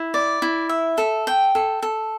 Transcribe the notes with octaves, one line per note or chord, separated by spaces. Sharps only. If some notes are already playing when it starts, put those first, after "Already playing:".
Already playing: E4
D5
E4
E5
A4
G5
A4
A4